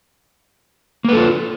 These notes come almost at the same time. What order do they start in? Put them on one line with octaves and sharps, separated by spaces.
A#3 B4 A4 F4